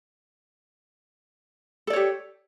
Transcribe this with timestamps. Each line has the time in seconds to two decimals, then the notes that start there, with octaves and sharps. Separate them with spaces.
1.87 A4
1.90 D5
1.93 C#5
1.96 G4